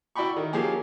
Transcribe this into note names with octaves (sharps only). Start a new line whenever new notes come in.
E4 F#4 D5 G5 B5 C#6
D#3
F3 F#3 A#3 G4 G#4